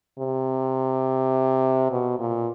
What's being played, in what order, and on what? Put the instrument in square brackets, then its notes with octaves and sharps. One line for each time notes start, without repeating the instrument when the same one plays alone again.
[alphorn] C3
B2
A#2